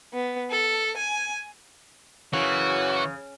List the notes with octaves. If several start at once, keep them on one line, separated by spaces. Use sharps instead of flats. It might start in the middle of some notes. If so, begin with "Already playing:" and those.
B3
A4
G#5
F#2 C#3 E3 F#4 C#5